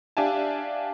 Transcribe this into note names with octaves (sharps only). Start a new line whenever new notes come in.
D4 G4 E5 F5 G#5 A5